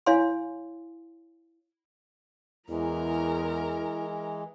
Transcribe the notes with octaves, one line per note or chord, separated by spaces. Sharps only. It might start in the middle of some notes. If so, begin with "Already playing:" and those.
E4 C#5 F5 G#5 C6
E2 E3 G#3 E4 A#4 A#5